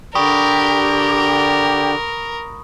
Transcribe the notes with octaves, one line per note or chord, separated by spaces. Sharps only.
D3 G4 A#4 D5 B5 C#6 D#6